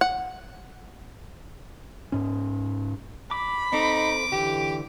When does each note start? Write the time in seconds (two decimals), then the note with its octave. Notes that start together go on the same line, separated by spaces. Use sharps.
0.01 F#5
2.12 G#2 C#4
3.31 B5 D6
3.73 C4 D#4 A4 D6
4.32 D3 E3 G4